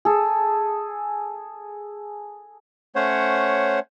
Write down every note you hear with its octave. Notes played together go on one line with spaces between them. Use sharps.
G#4 A4
A3 C#4 C5 C#5 F#5